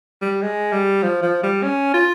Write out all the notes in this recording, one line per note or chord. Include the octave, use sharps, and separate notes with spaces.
G3
G#3
G3
F3
F3
G3
C#4
F4